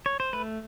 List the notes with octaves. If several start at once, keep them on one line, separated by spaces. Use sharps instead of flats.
C#5
C5
A3 B4